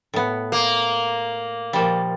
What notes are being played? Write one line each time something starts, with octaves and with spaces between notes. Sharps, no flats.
A2 B3
A#3
A#2 F3 G3